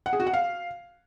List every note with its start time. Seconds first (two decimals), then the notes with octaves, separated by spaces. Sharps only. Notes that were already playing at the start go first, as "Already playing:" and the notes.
0.06 F#5
0.13 G#4
0.20 F#4
0.27 F#5
0.33 F5